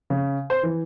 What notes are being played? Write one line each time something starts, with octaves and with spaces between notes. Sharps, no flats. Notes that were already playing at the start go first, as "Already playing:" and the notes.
C#3
C5
E3